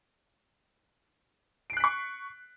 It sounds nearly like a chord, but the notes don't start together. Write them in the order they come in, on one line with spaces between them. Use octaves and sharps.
D7 C7 F#6 B6 C#6